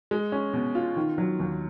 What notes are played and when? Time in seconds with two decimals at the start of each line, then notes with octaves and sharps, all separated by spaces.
0.11 G#3
0.32 C#4
0.53 B2
0.75 F4
0.96 D#3
1.18 F#3
1.40 D#2